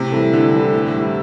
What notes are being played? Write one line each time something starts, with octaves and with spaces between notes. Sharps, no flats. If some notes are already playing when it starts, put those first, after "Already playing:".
Already playing: A2 C3
E3 G3 E4 A4
A2 D3
E3 G3 E4 A4
A2
G3 E4